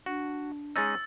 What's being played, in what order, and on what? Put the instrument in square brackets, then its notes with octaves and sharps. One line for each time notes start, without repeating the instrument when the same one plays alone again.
[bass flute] D4 [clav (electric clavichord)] F#4
[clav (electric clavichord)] G#3 C#4 D#4 [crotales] E6 A6